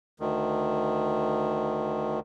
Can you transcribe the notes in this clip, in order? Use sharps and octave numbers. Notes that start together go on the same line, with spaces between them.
D2 D#3